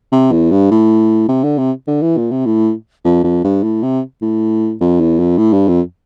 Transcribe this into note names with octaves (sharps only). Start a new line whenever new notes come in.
C3
E2
G2
A2
C3
D3
C3
D3
E3
A#2
C3
A2
F2
F2
G2
A2
C3
A2
F2
E2
F2
A2
G2
F2